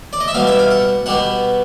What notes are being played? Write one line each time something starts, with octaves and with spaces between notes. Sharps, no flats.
D5
D#5
E5
B2 G3 B3 F5
E5
F5
F#5
B2 G3 B3 F#5